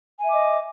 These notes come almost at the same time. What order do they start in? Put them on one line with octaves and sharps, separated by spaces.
G#5 E5 D6 D#5